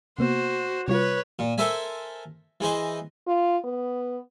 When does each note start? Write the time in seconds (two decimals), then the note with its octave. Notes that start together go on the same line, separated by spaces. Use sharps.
0.19 C3 A#3 B3 F#4 C5
0.88 C3 G3 F4 B4 C#5
1.39 A#2
1.58 A4 A#4 C5 E5 G#5
2.61 E3 G#4 C5 D#5
3.27 F4
3.65 B3